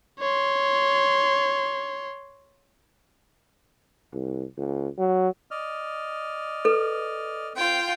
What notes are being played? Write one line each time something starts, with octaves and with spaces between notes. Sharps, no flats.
C#5 C6
C2
C#2
F#3
D5 D#5 F6
A4 B4
C4 F4 G5